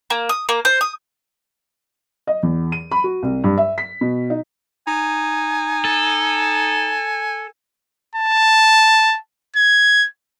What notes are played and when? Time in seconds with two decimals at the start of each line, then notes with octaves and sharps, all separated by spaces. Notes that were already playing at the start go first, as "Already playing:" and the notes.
0.10 A#3
0.29 D#6
0.49 A#3
0.65 C5
0.81 D#6
2.27 D#5
2.43 E2
2.72 D#7
2.91 B5
3.04 F#4
3.23 C2
3.44 G2
3.58 E5
3.78 B6
4.01 B2
4.30 D#4
4.87 D#4 G#5
5.85 A4
8.16 A5
9.56 G#6